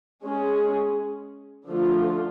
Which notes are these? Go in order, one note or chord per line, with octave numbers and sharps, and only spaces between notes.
G#3 C#4 G#4
D3 F3 A3 F4